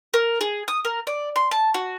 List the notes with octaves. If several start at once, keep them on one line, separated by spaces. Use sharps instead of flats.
A#4
G#4
D#6
A#4
D5
C6
A5
F#4